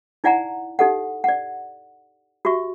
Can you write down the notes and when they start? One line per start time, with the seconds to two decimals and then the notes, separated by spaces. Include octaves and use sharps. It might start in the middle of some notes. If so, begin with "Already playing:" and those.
0.24 D#4 E4 D5 F#5 G#5 A#5
0.79 D#4 G4 A4 D#5 F#5
1.24 D5 F#5
2.45 F#4 G4 E5 C#6